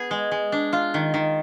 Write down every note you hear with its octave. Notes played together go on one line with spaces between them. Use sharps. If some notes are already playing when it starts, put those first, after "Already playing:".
Already playing: B3 G#4
G#3
G#3
D4
F4
D#3
D#3